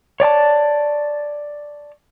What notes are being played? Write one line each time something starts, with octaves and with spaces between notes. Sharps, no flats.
C#5 D5 G#5 A5